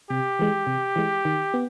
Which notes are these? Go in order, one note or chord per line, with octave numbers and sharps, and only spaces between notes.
C3 G4
E3 G#3
C3
E3 G#3
D#3
B3